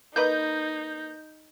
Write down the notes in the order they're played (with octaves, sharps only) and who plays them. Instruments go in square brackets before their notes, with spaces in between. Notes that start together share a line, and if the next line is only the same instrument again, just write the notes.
[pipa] A#3 B4 D#5 [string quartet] D#4 [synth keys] G6